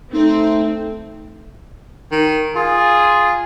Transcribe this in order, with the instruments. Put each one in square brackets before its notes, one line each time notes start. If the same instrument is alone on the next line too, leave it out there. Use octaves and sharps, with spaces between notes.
[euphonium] A3 [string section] C4 [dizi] D#4
[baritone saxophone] D#3
[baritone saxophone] F4 [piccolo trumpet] G#4